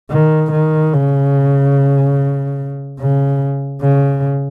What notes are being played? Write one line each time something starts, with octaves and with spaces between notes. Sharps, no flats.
D#3
D#3
C#3
C#3
C#3